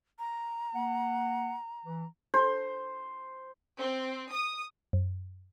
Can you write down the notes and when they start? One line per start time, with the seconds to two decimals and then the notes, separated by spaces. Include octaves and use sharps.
0.19 A#5
0.75 A#3 F#5
1.85 E3
2.34 C5
3.78 C4
4.31 D#6
4.93 F#2